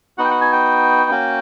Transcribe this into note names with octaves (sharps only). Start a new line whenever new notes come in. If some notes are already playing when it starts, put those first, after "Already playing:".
B3 D#4 F#4 F#5
G5
F#5
G#5
G5
A#3 C#4 F#4